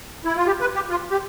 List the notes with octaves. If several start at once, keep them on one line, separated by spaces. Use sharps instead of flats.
E4
F4
G4
B4
G4
F4
G4